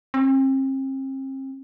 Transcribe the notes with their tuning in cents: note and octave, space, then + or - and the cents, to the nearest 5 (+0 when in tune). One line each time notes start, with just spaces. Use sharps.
C4 +40